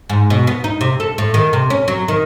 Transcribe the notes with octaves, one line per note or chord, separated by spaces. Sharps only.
G#2
B2
B3
D#4
C3
A4
A2
D#3
C3
C#4
F#3
D#3